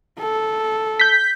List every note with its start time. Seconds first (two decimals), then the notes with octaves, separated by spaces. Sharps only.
0.19 A4
1.00 G6 B6